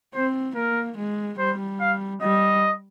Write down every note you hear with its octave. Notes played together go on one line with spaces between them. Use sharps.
C4 C5
A#3 A#4
G#3
G3 C5
F5
G3 D#5